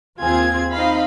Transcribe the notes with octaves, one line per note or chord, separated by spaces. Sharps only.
D#2 C4 F4 G#4 G#6
C4 D#4 D#5 F5 B5